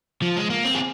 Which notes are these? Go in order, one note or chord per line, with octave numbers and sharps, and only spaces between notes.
F3
G#3
A#3
C4
G#4